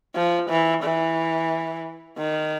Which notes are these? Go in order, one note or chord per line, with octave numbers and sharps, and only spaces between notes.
F3
E3
E3
D#3